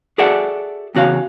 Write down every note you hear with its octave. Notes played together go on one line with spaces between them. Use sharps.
F#4 G#4 A4 D5 E5 F#5
E2 C#3 F#4 C#5 F5